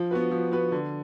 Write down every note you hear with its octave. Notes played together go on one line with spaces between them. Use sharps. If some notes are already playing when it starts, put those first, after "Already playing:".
Already playing: F3
B3 F#4 B4
F3
B3 F#4 B4
D3